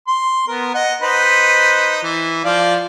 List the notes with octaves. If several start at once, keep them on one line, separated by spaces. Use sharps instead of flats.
C6
B3 A#4
D#5 F#5
D#4 B4 C5
E3
F3 D5 F5